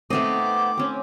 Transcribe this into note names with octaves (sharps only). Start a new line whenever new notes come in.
A3 B3 C4 D#4 D#5 D6
C4 C#4